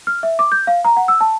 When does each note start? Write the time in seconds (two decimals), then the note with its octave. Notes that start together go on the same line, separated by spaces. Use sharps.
0.07 F6
0.23 E5
0.39 D6
0.52 G6
0.67 F5
0.85 A#5
0.97 F#5
1.08 E6
1.21 A5